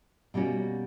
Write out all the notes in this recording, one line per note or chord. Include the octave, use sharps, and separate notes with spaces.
B2 G3 A#3 C#4 F#4